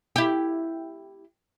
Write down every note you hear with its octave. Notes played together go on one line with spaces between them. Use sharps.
E4 G4